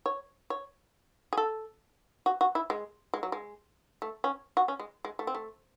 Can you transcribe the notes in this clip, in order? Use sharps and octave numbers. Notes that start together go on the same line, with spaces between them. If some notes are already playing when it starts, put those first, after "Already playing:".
C#5
C#5
G#4
A4
F#4
F#4
E4
G#3
G#3
F#3
G#3
A3
C#4
F#4
C#4
G#3
G#3
A3
C4
A3